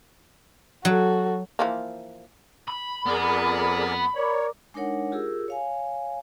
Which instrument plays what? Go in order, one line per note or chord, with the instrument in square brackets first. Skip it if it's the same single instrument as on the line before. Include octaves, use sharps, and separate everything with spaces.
[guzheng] F#3 [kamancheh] F#4 A4
[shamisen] E3 F3 A#3
[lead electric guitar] B5
[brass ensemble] F2 [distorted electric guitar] B3 [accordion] G#4 A#4 D5
[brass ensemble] A#4 D5 [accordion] C#5
[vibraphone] G#3 D4 D#4 A#4 C#5 F#5
F4 G4 G#4 A#4 E6
C#5 F5 G#5